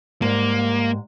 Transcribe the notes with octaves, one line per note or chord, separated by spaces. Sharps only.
G#2 G3 A#3